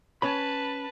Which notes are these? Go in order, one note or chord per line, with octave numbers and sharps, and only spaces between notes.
C#4 B4 C#5 A5 B5